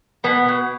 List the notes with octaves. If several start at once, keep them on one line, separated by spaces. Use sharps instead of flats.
B2 B3
B2